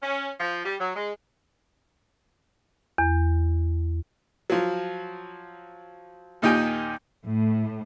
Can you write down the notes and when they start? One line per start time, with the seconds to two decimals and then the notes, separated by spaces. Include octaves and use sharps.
0.03 C#4
0.40 F3
0.65 G3
0.80 F#3
0.95 G#3
2.98 E2
4.50 F3 F#3
6.42 D#2 A#2 D#4 G4 G5 G#5
7.26 A2